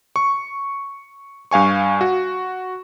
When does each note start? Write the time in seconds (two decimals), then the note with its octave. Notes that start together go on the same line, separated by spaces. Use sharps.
0.16 C#6
1.51 G2 F5 G#5 C#6
2.01 F#4